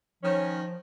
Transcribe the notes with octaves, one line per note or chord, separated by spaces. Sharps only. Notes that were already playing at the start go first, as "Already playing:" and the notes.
D#3 F3 C#4